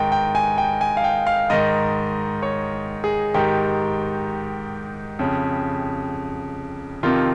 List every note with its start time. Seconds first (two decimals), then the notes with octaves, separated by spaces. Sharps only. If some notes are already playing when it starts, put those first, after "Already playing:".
Already playing: G#2 D#3 D#5 G5
0.12 G5
0.35 G#5
0.58 G5
0.81 G#5
0.97 F5
1.04 G5
1.27 F5
1.50 G#2 D#3 D#5
2.42 C#5
3.04 G#4
3.34 G#2 D#3 G4
5.19 F2 C#3
7.03 F2 C3 D#3 F4